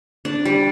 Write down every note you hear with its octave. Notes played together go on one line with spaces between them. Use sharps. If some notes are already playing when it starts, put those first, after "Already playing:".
D4
G3